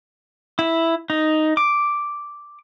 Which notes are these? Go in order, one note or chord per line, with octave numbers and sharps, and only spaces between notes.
E4
D#4
D6